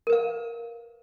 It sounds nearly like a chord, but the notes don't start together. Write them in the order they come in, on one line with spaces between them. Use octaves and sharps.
A#4 B4 F5